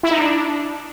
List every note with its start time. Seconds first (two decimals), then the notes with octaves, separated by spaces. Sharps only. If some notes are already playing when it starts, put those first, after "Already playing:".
0.03 E4
0.11 D#4
0.18 D4